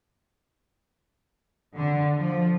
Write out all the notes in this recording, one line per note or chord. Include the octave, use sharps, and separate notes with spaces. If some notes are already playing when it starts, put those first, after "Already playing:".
D3
F3